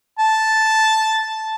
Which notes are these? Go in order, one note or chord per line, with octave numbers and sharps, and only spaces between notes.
A5